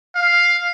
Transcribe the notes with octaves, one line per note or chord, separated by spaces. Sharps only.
F5